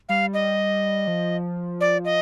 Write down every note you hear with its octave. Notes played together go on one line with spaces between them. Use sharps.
G3 F5
D#5
F3
D5
D#5